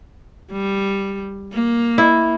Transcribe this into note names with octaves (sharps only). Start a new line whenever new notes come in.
G3
A#3
E4